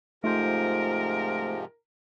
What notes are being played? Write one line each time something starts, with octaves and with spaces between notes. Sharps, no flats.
G#2 C3 F3 A3 D#4 F4 A#4 C5